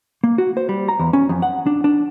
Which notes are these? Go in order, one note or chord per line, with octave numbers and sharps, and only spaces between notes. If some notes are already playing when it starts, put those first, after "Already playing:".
A#3
F#4
C5
G3
A#5
E2
C#4
F2
F#5
D4
D4